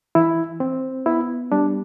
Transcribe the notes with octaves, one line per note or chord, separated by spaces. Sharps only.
E3 E4
C4
B3 E4
G3 D4